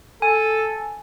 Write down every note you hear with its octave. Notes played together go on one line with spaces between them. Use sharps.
A4 G#5